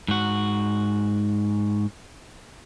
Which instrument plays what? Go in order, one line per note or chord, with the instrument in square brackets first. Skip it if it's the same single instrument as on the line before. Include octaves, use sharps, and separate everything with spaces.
[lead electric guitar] G#2 F#4